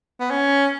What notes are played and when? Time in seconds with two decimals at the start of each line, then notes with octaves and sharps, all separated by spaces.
0.20 B3
0.31 C#4